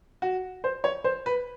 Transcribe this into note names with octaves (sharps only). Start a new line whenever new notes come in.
F#4
C5
C#5
C5
B4